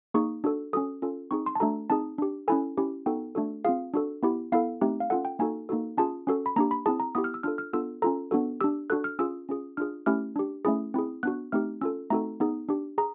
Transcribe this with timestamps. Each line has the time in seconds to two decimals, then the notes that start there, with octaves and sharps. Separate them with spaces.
0.14 A#3 D#4 G#4 C#6
0.44 D4 F#4 A4
0.73 C#4 F#4 A4 D#6
1.02 C#4 F4 A4
1.31 C4 D#4 G#4 C#6
1.46 C6
1.55 A5
1.60 A3 D4 F#4 A4 A#5
1.90 C4 D#4 G#4 A5
2.18 D4 G4
2.48 C#4 E4 A4 G#5
2.77 C#4 E4 G4
3.06 B3 D#4 F#4 A4 G5
3.35 A3 D4 F#4 A4
3.65 C4 F4 G#4 F5
3.94 D4 F#4 A4
4.23 B3 E4 G4
4.52 B3 E4 A4 F5
4.81 A3 C4 D#4 G4
5.00 F5
5.10 C#4 F4 A4 F#5
5.25 G5
5.39 A#3 D#4 F#4 A4 G#5
5.69 A#3 D#4 F#4 A4
5.97 C#4 F4 G#4 A5
6.27 C#4 F#4 A4
6.46 B5
6.56 A#3 D4 G4 A#5
6.71 B5
6.86 C4 E4 G#4 A5
7.00 A#5
7.15 B3 E4 G4 D#6
7.24 F6
7.34 E6
7.43 D4 F4 A4 F6
7.58 F6
7.73 B3 D4 F4 A4 E6
8.02 C#4 F4 A4 A#5
8.31 B3 D4 F#4 A4
8.61 D4 G4 E6
8.90 D4 F#4 A4 F#6
9.04 F6
9.19 C#4 F4 G#4 E6
9.49 C#4 F4 G#4
9.77 D4 F4 G#4 F6
10.06 A3 C#4 E4 G4 F6
10.36 D4 G4
10.65 A3 C#4 E4 G#4
10.94 C4 E4 G#4
11.23 B3 D4 F#4 F#6
11.52 A3 C4 D#4 G4 F6
11.81 C#4 F4 A4 E6
12.10 A3 C4 D#4 F#4 A4 A#5
12.40 B3 D#4 G#4
12.69 D4 G4
12.98 G#4 A#5